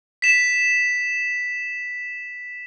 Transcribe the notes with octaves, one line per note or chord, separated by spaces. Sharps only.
B6 E7